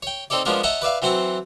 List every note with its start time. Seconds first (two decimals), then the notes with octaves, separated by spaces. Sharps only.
0.03 C#5 G5
0.30 C4 D#4 A4 C#5 D5
0.45 F3 G#3 B3 C#4 D4 A#4
0.63 C#5 D#5 E5 F#5 A5 A#5
0.82 B4 D5 E5 F5
1.02 E3 F#3 C4 C5 F#5 C#6